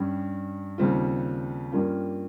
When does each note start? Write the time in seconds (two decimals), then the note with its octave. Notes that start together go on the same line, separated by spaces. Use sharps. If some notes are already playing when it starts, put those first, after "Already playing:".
Already playing: G2 G3 C#4
0.78 D#2 C#3 G3 C4 F4
1.72 G2 G3 A#3 C#4 F4